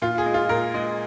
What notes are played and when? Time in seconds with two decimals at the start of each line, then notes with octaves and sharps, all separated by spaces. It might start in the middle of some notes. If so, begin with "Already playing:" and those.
0.02 A#2 F4
0.18 G#4
0.26 G#3
0.34 F4
0.49 A#2 A#4
0.74 G#3